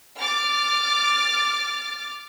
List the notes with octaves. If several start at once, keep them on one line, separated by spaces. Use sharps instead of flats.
D6 F6 A6